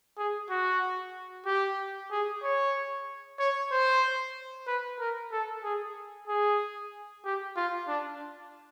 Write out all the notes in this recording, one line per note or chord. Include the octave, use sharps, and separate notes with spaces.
G#4
F#4
G4
G#4
C#5
C#5
C5
B4
A#4
A4
G#4
G#4
G4
F4
D4